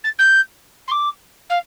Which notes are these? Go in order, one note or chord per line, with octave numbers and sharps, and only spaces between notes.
A6
G6
C6
D6
F5